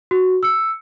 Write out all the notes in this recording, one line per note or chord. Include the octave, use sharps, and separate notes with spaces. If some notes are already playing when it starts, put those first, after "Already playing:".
F#4
E6 C#7